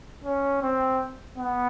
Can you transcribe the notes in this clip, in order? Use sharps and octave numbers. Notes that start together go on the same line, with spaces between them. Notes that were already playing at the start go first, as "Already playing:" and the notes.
C#4
C4
B3